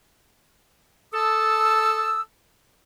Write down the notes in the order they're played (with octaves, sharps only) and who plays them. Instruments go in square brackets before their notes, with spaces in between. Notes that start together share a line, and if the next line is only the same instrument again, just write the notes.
[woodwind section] A4 A5 D#6 E6